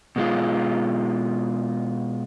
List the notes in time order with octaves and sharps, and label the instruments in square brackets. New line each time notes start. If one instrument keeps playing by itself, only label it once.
[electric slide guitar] B2 G#3 F4